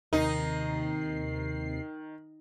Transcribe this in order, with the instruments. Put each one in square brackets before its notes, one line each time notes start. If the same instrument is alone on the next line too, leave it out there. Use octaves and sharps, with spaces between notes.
[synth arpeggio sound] D#2 C3 C7 [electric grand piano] D#3 [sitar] D#4